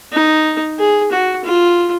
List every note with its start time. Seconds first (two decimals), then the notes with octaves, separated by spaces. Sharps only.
0.12 D#4
0.79 G#4
1.11 F#4
1.45 F4